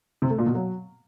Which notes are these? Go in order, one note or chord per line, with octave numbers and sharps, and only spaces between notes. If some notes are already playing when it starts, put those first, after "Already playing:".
C3
A3
A#2
B2
F#3